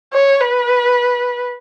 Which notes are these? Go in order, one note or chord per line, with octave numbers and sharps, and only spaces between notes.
C#5
B4